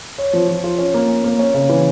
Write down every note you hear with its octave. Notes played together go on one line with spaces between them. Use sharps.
C#5
F3
F3
F4
C#4
A#3
C#4
A#3
C#4
C#3
E3